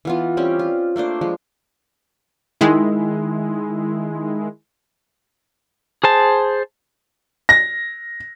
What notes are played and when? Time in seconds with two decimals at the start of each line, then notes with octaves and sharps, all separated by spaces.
0.05 E3 B3 F4
0.37 G3 C4 C#4 G4
0.59 F4
0.96 A3 A#3 D4 C5
1.21 F3 G#3
2.61 D#3 G#3 E4
6.04 G#4 C5 A5
7.49 A#6